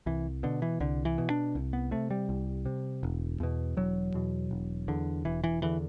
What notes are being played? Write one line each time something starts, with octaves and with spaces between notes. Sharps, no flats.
C2 E3
B2 D3
E3
C2 D3
E3
B2
D4
C2
B3
C3 A3
G3
C2
C3
E1
E2 B2
E1 F#3
E2 B2
E1
E2 D3
E1 E3
E3
E2 D3 E3